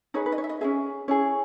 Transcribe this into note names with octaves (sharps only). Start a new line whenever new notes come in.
D#4 G#4 B4 C#5
B4
D#5
C#5
E5
D#5
C#4 E4 G#4 E5
C#4 E4 G#4 C#5